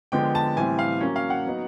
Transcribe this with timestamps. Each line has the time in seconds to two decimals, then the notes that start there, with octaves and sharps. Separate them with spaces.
0.12 D3 F3 G#3 B3 G5
0.35 A5
0.56 A2 E3 G3 C4 G#5
0.79 F5
1.01 F#3 A#3 C#4
1.16 F5
1.30 F#5
1.45 F#3 B3 D#4